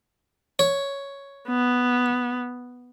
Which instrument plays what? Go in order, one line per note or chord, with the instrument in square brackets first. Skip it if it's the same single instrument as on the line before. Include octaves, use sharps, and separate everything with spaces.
[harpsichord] C#5
[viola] B3